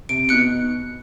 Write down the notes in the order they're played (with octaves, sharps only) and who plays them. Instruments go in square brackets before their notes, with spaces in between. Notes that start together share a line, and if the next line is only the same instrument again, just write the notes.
[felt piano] C3 [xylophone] D7
[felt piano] B2 B3 D#4 [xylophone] F#6 C#7